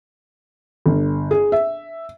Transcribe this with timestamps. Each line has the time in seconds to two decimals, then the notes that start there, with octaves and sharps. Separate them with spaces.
0.86 G1
1.31 G#4
1.52 E5